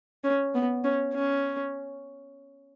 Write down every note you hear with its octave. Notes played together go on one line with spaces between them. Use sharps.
C#4
B3
C#4
C#4